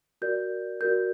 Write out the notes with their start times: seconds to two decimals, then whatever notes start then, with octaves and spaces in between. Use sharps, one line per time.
0.22 F#4 A#4 D5 G6
0.81 F#4 A#4 D5 G6